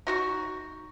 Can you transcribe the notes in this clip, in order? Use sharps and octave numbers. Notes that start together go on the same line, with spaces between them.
D#4 F#4 C#6